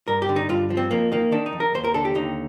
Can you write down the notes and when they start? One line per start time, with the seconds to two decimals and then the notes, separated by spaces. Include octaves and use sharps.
0.08 G2 A#4
0.22 G4
0.29 D3
0.36 D#4
0.49 G2 F4
0.70 F3
0.77 C4
0.91 F2 A#3
1.12 D#3 A#3
1.32 D#3 D4
1.46 D#4
1.53 F2
1.60 A#4
1.74 D#2 C5
1.84 A#4
1.94 D3 A4
2.05 G4
2.15 D#2 D#4